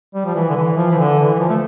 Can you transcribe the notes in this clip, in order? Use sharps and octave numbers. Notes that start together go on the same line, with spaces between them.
G3
F3
E3
D3
E3
F3
E3
D3
E3
E3
F3
A3